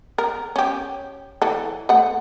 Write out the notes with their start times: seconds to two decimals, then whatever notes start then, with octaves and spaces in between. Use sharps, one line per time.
0.18 A#4
0.56 C#4 G4
1.42 E3 A4
1.89 A3 F#5